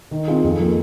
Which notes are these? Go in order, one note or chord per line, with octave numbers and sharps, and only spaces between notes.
D#3
C4 F4 G#4
F2
F3 A#3